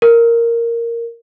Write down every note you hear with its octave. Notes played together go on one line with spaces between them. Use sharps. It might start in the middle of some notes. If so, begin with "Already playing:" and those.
A#4